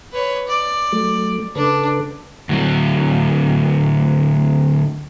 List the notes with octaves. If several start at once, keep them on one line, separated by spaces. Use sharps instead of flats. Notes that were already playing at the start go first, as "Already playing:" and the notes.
B4 C#5
D5
F#3 A3
C#3 D4 A4 B4
D2 F#3